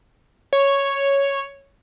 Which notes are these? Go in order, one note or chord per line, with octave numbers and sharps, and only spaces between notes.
C#5